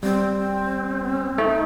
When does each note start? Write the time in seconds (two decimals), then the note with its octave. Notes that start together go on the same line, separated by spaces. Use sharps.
0.03 G3 C4
1.38 A3 D#4